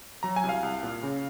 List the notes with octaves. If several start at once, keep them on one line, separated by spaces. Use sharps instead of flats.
F#3 A#5
G#5
C2
F5
C2
A#2
C#3